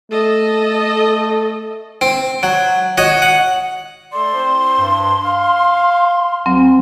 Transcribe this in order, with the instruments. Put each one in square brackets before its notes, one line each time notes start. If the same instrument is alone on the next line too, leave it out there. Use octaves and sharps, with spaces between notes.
[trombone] A3 [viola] A4 D#5
[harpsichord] C4
F#3
F#4 C#5 D#5
F#5
[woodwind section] A3 A4 D5 [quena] C6
[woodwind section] C4 E4 C5
G2
F5
[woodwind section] D2 [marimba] F#3 C4